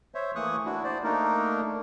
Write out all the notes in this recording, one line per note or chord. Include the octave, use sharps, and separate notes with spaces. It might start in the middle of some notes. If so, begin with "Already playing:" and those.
C5 C#5 E5
E3 A3 A#3 C#6 D#6 F#6
D4 E4 F#4
C5 D5
A3 A#3 D4 D#4 A#4